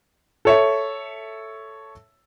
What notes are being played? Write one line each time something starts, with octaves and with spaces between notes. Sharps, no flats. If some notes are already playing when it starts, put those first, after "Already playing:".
A4 C#5 E5